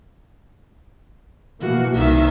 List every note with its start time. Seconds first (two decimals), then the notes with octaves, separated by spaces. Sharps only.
1.61 B2 E3 A#3 F#4
1.95 C2 D#3 E5